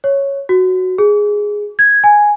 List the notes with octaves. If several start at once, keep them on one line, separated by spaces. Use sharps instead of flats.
C#5
F#4
G#4
G#6
G#5